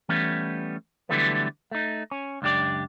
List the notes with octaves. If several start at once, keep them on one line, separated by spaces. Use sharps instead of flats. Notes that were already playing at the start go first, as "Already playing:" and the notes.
E3 G3 A3 B3 C#4
D3 E3 F#3 G3 A3 B3
A3 D#4
C#4
C#2 F#2 D4 G4 D5